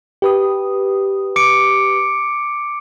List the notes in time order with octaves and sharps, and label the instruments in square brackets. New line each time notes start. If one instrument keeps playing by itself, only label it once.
[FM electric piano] G4 B4 D#6
[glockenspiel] D6 C#7 D7